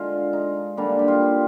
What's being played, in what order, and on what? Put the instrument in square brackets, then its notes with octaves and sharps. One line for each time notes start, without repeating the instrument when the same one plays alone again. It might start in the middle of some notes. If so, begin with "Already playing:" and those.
Already playing: [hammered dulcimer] D3 G#3 F4
D#4
D3 G3 A#3 D4
G4
F4